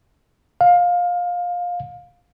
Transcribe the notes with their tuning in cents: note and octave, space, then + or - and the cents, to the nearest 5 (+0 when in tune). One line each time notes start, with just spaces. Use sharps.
F5 +20